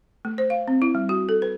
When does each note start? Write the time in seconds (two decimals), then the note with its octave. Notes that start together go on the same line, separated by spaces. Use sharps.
0.25 A3
0.38 C5
0.50 F5
0.68 C4
0.82 E4
0.95 G3
1.09 F#4
1.29 A4
1.42 B4